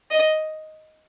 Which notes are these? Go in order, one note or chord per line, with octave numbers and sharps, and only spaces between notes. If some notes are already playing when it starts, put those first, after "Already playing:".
D#5